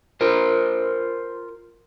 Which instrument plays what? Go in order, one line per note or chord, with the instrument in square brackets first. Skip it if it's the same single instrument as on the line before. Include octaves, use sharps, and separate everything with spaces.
[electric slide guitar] F4 A#4 C5